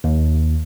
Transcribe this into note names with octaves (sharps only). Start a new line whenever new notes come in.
D#2